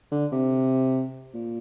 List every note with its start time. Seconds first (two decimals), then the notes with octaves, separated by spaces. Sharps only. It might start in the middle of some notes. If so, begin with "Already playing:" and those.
0.12 D3
0.32 C3
1.34 A#2